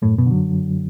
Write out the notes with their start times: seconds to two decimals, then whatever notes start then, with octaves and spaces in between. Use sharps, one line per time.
0.02 F#2 A2
0.18 B2
0.26 D3 F#3